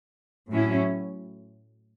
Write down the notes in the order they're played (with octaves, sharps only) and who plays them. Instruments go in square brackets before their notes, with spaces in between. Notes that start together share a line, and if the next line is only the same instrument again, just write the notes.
[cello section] A2 F#3 C#4 E4